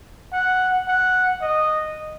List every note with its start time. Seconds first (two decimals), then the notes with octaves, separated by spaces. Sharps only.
0.32 F#5
0.88 F#5
1.41 D#5